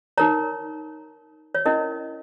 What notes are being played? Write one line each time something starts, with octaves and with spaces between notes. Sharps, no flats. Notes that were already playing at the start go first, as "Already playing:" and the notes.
D#4 A#4 C#5 A#5
C#5
C#4 E4 A#4 D#5